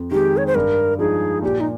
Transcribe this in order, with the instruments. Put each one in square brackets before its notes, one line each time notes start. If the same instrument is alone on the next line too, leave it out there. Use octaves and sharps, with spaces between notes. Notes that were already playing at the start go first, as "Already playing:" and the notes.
Already playing: [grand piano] F2
[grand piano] D#3 G#3 [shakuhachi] G4
[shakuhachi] C#5
C5
[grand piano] G2 [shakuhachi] A#4
[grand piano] F3 G#3 D#4 [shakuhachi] G#4
[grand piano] A#2 [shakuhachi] G4
[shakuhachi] D#4